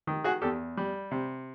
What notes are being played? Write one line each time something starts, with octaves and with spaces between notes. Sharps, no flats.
D#3
F#4 G#4
E2 G4 A4
G3
C3